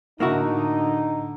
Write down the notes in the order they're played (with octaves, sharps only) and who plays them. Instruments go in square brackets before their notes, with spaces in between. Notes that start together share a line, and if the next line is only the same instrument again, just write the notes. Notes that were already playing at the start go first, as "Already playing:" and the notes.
[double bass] A2 D3 [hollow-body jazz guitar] A#3 E4 F#4 [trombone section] D#4